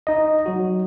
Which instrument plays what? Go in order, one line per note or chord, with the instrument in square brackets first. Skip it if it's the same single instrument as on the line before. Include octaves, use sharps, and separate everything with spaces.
[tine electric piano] D#4 D#5
F#3 F#4